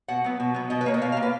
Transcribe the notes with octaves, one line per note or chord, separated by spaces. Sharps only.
B2 F#5
F#3 B3
B2
F#3 B3
B2 D#5
B4
A#3 C#5
D#5
B2 F5
F5
A#3
B4